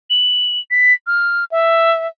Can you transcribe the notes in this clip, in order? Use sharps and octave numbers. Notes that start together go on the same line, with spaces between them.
F#7
B6
F6
E5